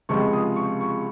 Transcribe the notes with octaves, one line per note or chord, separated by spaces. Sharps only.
C#2 C3 F3 G#3 C#6
D#6
C#6
C#6